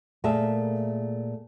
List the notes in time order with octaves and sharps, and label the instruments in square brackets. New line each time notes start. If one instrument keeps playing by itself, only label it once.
[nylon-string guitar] A#2 A3 G#4 A#4 E5 A5